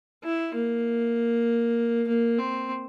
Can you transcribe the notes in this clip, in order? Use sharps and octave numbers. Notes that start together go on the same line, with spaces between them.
E4
A#3
A#3
C4